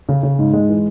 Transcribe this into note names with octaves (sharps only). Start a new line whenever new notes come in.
C#3
C#3
G#2
G#3
E3